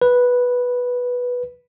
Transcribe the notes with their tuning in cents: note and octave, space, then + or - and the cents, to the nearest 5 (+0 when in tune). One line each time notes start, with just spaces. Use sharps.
B4 -5